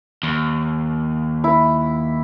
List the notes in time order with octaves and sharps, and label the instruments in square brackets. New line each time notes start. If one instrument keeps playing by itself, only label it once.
[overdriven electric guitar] D#2
[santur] E4